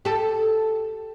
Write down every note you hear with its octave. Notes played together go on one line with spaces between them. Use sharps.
G4 A4